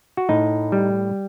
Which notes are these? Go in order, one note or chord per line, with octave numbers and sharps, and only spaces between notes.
F#4
A2 D#4
G3